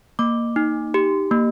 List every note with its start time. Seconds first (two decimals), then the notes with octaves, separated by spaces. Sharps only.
0.19 A#3 D6
0.56 D#4
0.94 G4
1.31 A#3